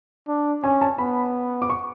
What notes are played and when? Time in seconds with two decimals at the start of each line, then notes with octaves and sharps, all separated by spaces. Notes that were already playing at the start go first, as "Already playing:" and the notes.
0.28 D4
0.63 C#4 G#5
0.81 A5
0.98 B3 B5
1.62 D6
1.70 C#6